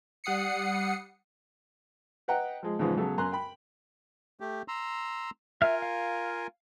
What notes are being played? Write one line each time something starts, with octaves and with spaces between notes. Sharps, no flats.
G3 F#5 D#6 C7 C#7
B4 D#5 F#5 G5 A#5
F3 G#3
E2 G#2 C#3 F3 G#3 B3
C#3 F#3 B3 A4 B4
F#2 G#5 A#5 C6 F#6
G5 B5
A3 G4
A#5 C6 E6
F4 A#4 E5 F5 G#5 F6
F5